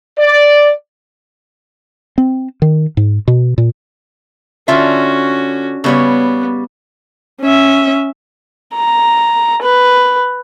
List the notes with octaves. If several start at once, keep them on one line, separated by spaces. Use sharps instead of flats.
D5
C4
D#3
G#2
B2
A#2
D3 C#4 F4 F#4 E5
C#3 G3 B3 C#5
C#4 E5
A#5
B4